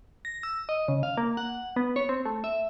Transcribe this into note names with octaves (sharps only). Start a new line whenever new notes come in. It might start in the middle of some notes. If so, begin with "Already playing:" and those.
A#6
E6
D#5
C#3
F5
A#3
F#5
B3
C#5
C4
A3
E5